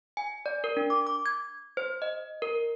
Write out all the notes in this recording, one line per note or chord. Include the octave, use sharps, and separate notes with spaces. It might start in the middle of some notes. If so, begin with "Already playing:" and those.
G#5
D5
A#4
D4
D6
D6
G#6
C5
D#5
A#4